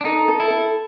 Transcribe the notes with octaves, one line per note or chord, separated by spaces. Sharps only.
D4
D#4 A4
A4
E4
A4